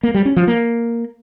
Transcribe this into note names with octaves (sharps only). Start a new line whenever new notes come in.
A#3
G3
C#4
F3
A#3